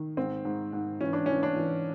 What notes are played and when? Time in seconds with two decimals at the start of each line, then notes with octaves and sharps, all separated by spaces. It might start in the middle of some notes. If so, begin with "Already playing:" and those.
Already playing: D#3
0.17 G#2 C4
0.45 G#2
0.73 G#2
1.01 E3 C#4
1.13 D4
1.26 E3 C#4
1.43 D4
1.56 E3